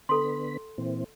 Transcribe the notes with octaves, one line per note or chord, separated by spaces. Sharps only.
D3 B3 A4 B5 C6
A#2 E3 C4